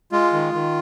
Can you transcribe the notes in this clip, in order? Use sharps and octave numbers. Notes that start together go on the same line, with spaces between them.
G#3 F4
D#3
D#3